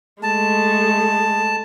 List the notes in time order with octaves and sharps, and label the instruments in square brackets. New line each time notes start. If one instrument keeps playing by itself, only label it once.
[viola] G#3 A3 [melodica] A5